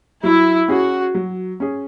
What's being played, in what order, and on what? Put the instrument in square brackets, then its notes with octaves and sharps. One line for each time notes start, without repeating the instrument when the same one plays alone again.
[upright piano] F#3 [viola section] E4
[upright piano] C#4 G#4 [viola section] F#4
[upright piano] F#3
C#4 G#4